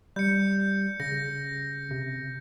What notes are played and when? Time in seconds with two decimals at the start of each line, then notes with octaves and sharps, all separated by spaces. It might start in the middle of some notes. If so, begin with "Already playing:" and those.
0.16 G3 G6 C#7
1.00 C#3 A#6
1.91 C3